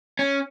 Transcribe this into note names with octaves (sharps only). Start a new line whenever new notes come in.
C#4